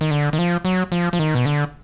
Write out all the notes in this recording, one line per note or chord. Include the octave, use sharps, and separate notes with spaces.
D#3
D3
D#3
F3
F#3
F3
F3
D#3
B2
D3